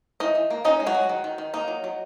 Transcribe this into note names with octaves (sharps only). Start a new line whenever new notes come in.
E3 D#4 D#5
E3
A#3
C#4 D#4 D#5
G#3
F#3 F#4
G#3
D#3
D#3
D#3
A#3 D#4
F#3
F#3